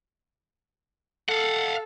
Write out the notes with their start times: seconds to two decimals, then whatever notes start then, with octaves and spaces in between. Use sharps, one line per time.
1.29 A4 F5 F#5